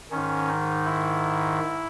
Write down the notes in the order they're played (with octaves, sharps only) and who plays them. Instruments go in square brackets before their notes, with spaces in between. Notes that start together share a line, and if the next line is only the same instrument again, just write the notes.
[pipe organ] G#2 D#3 C#4
D#4
E4